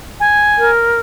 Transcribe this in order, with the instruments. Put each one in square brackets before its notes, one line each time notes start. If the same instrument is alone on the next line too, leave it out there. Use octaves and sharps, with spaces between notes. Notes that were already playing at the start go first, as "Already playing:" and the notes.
[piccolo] G#5
[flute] A#4